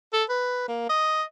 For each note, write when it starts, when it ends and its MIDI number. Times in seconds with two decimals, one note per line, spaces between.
0.13 0.24 69
0.29 0.64 71
0.68 0.88 58
0.89 1.23 75